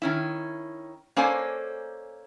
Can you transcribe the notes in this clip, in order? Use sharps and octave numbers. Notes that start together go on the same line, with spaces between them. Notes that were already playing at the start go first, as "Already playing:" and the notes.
D#3 C#4 E4
A#3 C#4 A4 C5 D5 G#5